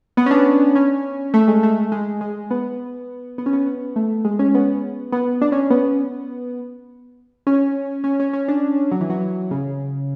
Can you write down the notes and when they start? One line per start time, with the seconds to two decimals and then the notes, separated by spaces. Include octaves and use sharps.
0.17 B3
0.26 C#4
0.31 D4
0.75 C#4
1.34 A3
1.48 G#3
1.63 A3
1.92 G#3
2.21 G#3
2.51 B3
3.38 B3
3.46 C#4
3.53 B3
3.66 B3
3.96 A3
4.25 G#3
4.39 C#4
4.55 B3
5.12 B3
5.42 D4
5.52 C#4
5.70 B3
7.47 C#4
8.04 C#4
8.20 C#4
8.33 C#4
8.48 D4
8.92 F#3
9.01 E3
9.10 F#3
9.51 C#3